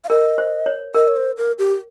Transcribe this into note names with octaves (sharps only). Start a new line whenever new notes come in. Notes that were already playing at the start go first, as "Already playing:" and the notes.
F5
A#4 D#5
C5
C#5
A#4 D#5
C#5
C5
A#4
G4